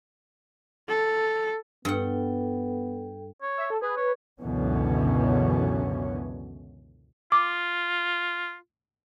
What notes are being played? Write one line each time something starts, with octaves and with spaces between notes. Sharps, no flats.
A4
G2 B3 A4 F#5 G5
C#5
E5
A4
G#4 B4
C#5
C#2 F#2 B2 D3 E3 C#4
F4 D6